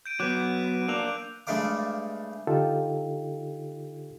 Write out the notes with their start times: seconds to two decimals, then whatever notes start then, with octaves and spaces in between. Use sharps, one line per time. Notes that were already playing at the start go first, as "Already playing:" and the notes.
0.06 G6 D7 D#7
0.20 F#3 B3 D6 F#6 G6
0.88 A#3 D4 E6 F#6 F7
1.47 G2 G#3 A3 F5 D6
2.47 D3 D#4 F4 G4 A4